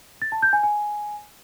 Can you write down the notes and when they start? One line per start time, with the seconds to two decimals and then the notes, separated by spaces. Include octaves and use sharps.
0.22 A6
0.32 A5
0.42 G6
0.53 G#5
0.63 G#5